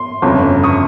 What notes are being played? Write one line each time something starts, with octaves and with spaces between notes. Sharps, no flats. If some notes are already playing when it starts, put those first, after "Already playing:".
Already playing: C6
G1 F2 C#3
C#6 D#6